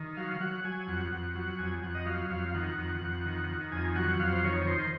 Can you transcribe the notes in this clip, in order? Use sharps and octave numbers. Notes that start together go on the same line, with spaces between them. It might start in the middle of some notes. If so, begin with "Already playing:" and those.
Already playing: D#3
F#3 F5
F#3 F#5
F#5
F#3 G#5
F2 F#5
F2 F#5
F#3 F#5
F2 G#5
F2 F#5
D#5
F#3 F5
F2 F5
F5
D#3 F#5
F2
F2
D#3
D#3
F2 G#5
F#3 F#5
F2 F5
C5
D#3 C#5
D#3 C5